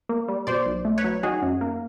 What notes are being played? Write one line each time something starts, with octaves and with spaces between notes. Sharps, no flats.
A#3
G3
B2 C5 D5
B1
A3
B4 C#5
F#3
D#3 F#4 G#4
F#2
A#3